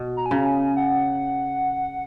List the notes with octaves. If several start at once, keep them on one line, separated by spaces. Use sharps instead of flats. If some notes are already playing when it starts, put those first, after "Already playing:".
Already playing: B2
A#5
G#5
C#3 A#5
G#5
F#5